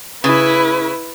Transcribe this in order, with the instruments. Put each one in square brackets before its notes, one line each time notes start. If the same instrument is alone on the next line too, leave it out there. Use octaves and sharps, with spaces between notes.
[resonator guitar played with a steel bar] C#3 [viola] E4 B4